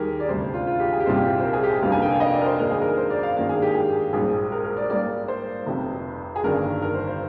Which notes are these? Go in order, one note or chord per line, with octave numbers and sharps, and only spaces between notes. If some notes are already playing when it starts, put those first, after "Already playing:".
Already playing: D#2 D#3 G3 G4 G#4 A#4
D5
D2 C3 G3 D4 C5
F4
F4
G4
G#4
G4
C2 A#2 G3 C4 D#4 F4
G4
C5
A#4
G#4
G4
G#4
F1 F2 D3 G3 A#3 F5
G#5
G5
F5
D#5
D5
A#4
C5
G#2 D#3 A#3 D4 A#4
G#4
A#4
C5
D5
F5
G#2 D#3 A#3 D4 F5
G#4
G4
G#4
A#1 G#2 G3 G#4
A#4
A#4
D5
G#2 G3 A#3 D5
C5
F1 F2 C3
G#4
G1 G2 D#3 A#3 D4 A#4
A#4
C5
C5